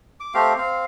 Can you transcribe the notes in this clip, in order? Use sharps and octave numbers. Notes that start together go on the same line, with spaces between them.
D6
A3 C4 G4 F5
C4 F5